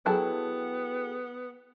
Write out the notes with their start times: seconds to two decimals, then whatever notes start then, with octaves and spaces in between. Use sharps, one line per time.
0.06 F#3 B3 E4 G#4 A4 G5 A5